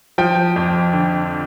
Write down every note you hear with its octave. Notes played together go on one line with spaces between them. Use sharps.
F3 G5
F2
D3